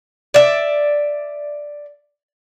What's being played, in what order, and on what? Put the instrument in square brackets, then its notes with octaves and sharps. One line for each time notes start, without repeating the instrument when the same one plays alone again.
[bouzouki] D5 E5